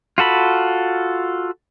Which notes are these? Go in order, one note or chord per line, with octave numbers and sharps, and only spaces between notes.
F4 F#4 A4 B5